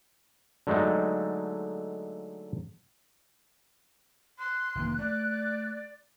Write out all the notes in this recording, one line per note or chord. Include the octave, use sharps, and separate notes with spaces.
D3 F#3 G#3 A3 D#4
C6 F#6
F1 D#3 A#3
A3 D5